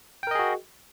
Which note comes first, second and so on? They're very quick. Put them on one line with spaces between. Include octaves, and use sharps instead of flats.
G5 A#4 D#5 G#4 F#4